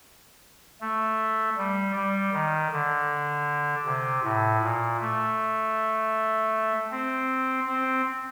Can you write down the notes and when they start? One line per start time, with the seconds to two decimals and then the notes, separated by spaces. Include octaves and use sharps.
0.81 A3
1.57 G3
1.95 G3
2.33 D#3
2.72 D3
3.86 C3
4.24 A2
4.62 A#2
5.01 A3
6.91 C4
7.67 C4